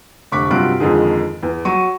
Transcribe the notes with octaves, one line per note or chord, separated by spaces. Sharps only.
F1 D3 C#6 D6 F#6 B6
G2 C3 F#3 F4 F#6 D7
F2 G#2 D3 D#3 F3 G#4
E2
F#3 C#6 D#7